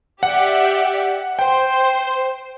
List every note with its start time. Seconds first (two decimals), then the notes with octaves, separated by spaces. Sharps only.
0.23 G4 D5 E5 F#5
1.39 C5 G5